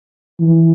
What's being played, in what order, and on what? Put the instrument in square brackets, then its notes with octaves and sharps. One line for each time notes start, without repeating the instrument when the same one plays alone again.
[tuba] E3